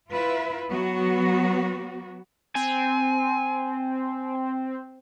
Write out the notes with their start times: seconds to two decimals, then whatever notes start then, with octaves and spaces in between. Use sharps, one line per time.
0.10 E4 F4 B4
0.69 F#3 B3 F#4
2.55 C4 G#5